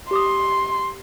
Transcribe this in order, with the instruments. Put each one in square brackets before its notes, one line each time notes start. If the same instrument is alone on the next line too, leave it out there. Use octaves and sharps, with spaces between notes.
[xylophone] G4 D6 D#6 [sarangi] C6